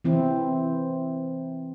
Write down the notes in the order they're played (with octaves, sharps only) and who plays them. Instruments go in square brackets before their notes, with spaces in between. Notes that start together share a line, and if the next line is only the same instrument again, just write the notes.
[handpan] E3 C4 E4